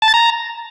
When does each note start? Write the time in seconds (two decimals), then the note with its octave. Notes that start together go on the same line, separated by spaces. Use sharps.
0.02 A5
0.08 A6
0.14 A#5